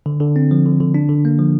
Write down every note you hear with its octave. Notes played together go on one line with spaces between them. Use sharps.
D3
D3
C4
F3
D3
D3
D4
D3
A#3
F3